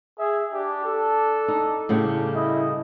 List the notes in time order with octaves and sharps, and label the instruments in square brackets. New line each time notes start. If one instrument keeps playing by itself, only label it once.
[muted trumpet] G#4 [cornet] E5
[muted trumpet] D4 [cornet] G4
[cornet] A4
[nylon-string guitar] D#4
[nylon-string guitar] A2 C#3 G3 [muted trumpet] D4
[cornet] E4 [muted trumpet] D#5